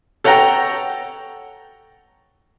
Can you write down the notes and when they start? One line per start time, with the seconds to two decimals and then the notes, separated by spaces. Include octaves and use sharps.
0.24 A4 C#5 F#5 G5 A#5